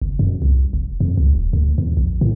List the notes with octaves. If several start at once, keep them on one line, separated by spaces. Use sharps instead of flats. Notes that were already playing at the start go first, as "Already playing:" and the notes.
F#1
F#2
C2
F1
F2
C#2
D#1
D2
E2
A#1
A2